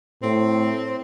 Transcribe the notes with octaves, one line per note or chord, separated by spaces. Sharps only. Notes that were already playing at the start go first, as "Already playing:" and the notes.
A2 C4